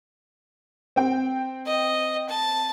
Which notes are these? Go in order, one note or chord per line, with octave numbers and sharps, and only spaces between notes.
C4 G5
D#5
A5